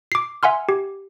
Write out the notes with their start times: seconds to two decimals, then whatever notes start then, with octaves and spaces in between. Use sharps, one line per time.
0.12 D6 C7
0.43 E5 F#5 G#5 C6 F6
0.69 G4